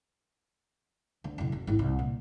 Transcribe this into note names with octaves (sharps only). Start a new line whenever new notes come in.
D2
F#1 B1
F#2
G#1 E4
C2
A#2